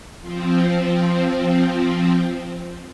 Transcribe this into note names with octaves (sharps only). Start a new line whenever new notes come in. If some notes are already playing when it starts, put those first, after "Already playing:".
F3 C4